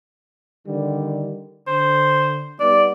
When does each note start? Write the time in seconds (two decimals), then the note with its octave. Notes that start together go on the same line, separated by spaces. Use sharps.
0.67 D3 D#3 G3
1.67 D3 C5
2.60 G3 B3 D#4 D5